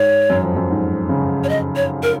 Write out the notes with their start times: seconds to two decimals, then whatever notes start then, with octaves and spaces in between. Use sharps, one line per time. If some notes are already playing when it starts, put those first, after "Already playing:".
Already playing: G#2 C#5
0.30 F#2
0.43 F2
0.57 F#2
0.70 G#2
1.09 C#3
1.44 C#5
1.49 D#5
1.76 C#5
2.03 A#4